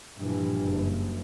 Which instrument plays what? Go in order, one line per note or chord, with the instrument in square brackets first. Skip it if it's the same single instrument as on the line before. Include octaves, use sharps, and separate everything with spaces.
[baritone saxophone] G2 [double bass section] A#2 E3 F3
[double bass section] F#1